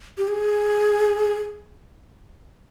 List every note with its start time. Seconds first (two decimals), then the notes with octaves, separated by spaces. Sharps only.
0.18 G4
0.28 G#4